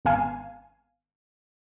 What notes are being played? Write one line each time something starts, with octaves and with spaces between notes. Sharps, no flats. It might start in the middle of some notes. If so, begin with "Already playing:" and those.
G#1 B3 F5 G#5